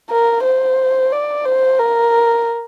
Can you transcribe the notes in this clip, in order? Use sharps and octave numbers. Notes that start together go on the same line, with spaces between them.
A#4
C5
D5
C5
A#4